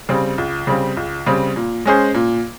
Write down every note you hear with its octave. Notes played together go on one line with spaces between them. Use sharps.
C#3 G3 C4
C#2
C#3 G3 C4
C#2
C#3 G3 C4
A#2
G#3 C#4 G#4 C5
A#2